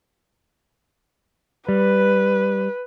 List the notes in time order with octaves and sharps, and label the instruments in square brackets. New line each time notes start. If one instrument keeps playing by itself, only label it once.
[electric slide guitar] G3 [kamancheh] B4